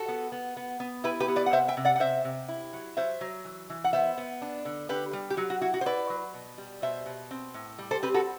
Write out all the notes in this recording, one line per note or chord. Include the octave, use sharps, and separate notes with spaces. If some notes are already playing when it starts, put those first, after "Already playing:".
Already playing: F#4 A4
B3
B3
B3
B3
E4 G4 B4
G4 B4
B3
B4 D5
F#5
C3 C5 E5
E5 G5
C3
D5 F#5
F#5
C3 C5 E5
C3
E4
F#3
F#3 C5 E5
F#3
E3
E3
F#5
B3 C5 E5
B3
D4
D3
D3 G4 B4
G3
G4
F#3 F#4
F#4
E4 F#4
F#4
C5
E4 B4 D5
F#3
B2
G3
B2 C5 E5
B2
C4
A2
G3
A4 C5
C4 G4 B4
F#4 A4